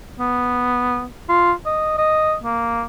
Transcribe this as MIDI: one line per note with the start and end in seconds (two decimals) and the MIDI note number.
0.19 1.05 59
1.29 1.52 65
1.66 1.95 75
1.98 2.35 75
2.43 2.84 58